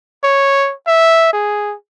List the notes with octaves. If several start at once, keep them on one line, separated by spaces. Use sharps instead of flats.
C#5
E5
G#4